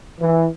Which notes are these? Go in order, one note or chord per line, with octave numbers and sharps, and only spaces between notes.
E3